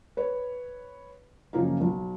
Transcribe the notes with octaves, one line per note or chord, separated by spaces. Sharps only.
B4 C#5
F#2 C#3 F3 A#3 D#4 F4
B1